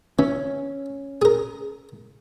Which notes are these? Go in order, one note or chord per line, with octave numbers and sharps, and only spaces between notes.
E3 C#4
G#4 A#4